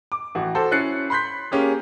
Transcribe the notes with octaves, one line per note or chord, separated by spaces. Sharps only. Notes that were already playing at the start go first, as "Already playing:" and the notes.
D6
A1 F#4
F#4 A4 C5
C#4 E4 F#6 A6 C7 C#7
B5 C6 F#6 G6 B6
A#3 C#4 G4 G#4